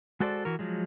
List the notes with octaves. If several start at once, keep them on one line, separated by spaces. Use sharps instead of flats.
G#3 F#4 A4 C5 D5
E3 F#4 A#4
F3 F#3 G#3